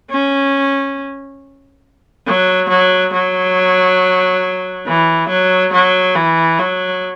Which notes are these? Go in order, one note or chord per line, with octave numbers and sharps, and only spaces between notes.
C#4
F#3
F#3
F#3
E3
F#3
F#3
E3
F#3